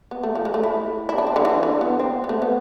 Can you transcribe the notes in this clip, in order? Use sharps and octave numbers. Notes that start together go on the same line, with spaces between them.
B3
A3
F3
G#3
A3
E4
E4
D4
C4
D3
E3
D3
B3
C4
B3
A3
B3